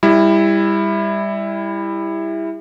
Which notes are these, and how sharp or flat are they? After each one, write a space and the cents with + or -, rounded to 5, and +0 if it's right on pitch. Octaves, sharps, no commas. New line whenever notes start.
G3 +25 E4 +0